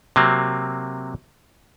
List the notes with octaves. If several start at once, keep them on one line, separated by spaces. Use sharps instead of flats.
C3 F#3 A#3 C4